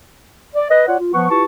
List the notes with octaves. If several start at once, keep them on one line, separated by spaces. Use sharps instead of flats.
D5
B4 D#5
F4 C#5 D5 F#5
F4
F3 B3 B4 F#5 C#6
E4 F4 G4 B4 A5 C#6